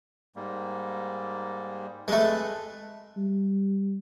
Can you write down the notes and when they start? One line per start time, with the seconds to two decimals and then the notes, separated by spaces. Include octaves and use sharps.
0.36 G#2 G3 A#3
2.08 F2 G#3 A3 B4 F#6
3.17 G3